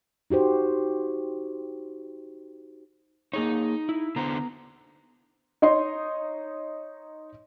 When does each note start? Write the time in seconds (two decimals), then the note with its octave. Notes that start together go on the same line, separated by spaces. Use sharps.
0.30 D#4 F#4 G4 C5
3.33 A#3 D#4 G#4 C#5
3.89 E4
4.16 D3 B3 C5 A#5
5.62 D#4 C#5 D#5 C6